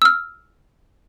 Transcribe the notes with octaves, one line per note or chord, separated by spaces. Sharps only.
E6 F6